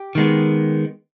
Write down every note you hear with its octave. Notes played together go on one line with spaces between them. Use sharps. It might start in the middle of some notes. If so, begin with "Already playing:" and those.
Already playing: G4
D#3 G#3 B3